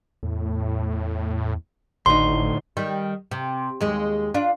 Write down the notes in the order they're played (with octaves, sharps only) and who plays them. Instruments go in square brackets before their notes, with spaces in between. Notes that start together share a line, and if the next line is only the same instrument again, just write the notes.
[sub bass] E2 [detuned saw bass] A2
[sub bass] G#1 [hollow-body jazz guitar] D2 D#4 [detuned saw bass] A2 [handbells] C6
[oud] D#3 G3
C3
D#2 G#3
D4 F4